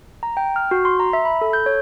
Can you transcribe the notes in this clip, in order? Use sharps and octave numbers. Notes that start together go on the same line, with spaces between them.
A#5
G5
F6
F#4
C6
A#5
E5
B5
A4
G6
C#5